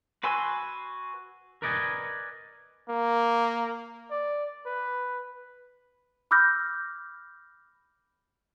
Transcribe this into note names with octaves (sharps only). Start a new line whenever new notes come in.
F#4 B4 G#5 C6 E6
A#4 B4 D5 D#5 F#5 G#5
A#3
D5
B4
B5 D6 E6 F6 G6 A#6